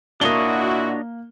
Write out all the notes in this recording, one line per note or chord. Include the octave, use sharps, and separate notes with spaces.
A#2 A#3 D4 E4 F#4 C#5 D#5 G7